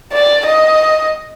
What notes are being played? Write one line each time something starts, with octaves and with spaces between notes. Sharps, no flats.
D5
D#5